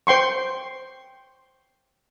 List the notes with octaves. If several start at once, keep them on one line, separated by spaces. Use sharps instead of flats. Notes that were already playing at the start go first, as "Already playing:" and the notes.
C5 G5 C6 C#6